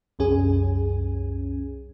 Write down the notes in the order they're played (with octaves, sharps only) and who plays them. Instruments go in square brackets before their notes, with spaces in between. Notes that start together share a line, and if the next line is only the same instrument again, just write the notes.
[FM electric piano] C2 F#2 C#4 G#4